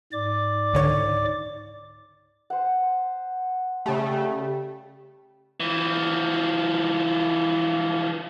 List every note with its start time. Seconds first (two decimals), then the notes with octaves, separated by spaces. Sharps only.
0.12 G#2 D5 D6
0.73 C#2 D3 C#5
2.50 C5 F#5
3.86 C#3 G3 A3
5.60 E3 F3